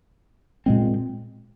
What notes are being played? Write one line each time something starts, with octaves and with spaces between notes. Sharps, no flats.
A#2 G#3 C4